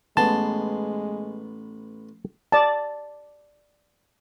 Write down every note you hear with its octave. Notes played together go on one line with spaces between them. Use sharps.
A1 G#3 B3 A5 C6
D5 A5